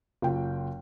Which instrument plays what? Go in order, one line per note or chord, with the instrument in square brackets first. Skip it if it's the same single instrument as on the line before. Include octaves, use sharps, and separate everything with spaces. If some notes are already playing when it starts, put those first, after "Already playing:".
[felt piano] F#1 F4 G5